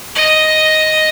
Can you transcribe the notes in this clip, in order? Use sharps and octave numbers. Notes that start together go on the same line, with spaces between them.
D#5